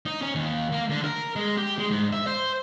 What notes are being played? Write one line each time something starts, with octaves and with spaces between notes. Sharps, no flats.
D#4
C#4
D#2
A#3
D3
A#4
G#3
G4
G#3
G#2
E5
C5